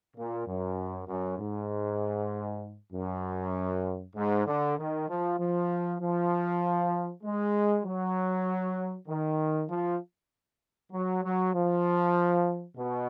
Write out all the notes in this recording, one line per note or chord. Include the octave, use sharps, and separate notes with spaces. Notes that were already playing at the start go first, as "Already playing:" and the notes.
A#2
F#2
F#2
G#2
F#2
G#2
D3
D#3
F3
F3
F3
G#3
F#3
D#3
F3
F#3
F#3
F3
B2